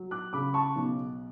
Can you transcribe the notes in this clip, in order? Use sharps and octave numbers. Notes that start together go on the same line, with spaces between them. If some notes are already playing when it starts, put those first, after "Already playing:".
Already playing: F#3
D6 F#6
C#3 B5 D6
A5 C#6
B1